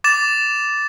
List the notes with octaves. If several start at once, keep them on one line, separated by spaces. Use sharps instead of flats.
D6 A6 E7